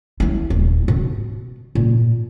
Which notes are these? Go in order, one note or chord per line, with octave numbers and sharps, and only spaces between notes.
F#3 E4
D#1
B2
A#2